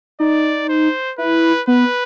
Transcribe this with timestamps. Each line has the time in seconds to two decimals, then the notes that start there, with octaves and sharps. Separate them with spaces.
0.20 D#4 D5
0.69 C5
1.18 E4 B4
1.67 B3 B4